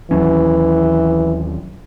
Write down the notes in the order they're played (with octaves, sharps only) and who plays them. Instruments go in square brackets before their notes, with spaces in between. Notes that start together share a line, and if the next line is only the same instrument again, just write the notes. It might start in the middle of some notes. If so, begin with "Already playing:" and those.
[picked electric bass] D#2 F#3 C#4 [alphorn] E3